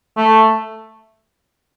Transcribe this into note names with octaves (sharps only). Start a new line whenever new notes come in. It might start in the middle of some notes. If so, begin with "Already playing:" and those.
A3